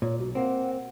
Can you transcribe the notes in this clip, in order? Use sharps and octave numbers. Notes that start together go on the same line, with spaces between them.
A#2 C#5
B1 F#4
A#3 C4 F#5